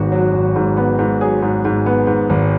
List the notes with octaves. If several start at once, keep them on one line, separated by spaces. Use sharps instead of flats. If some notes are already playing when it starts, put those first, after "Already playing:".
Already playing: G#1 G#2 B3 F#4
F#3
G#1
G#2
B3
G#2
F#3 G#4
G#2
G#2
B3
G#2
G#1